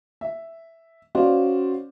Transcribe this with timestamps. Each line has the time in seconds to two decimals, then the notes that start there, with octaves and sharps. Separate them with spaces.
0.21 E5
1.15 C#4 F#4 C5 D5 F5